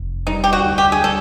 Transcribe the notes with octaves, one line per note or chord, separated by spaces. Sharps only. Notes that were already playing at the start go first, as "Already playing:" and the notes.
Already playing: F1
G3 D#4
G4
F#4
D2
G4
G#4
G3 A4